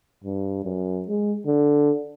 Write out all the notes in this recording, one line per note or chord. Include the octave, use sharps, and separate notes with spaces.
G2
F#2
G#3
D3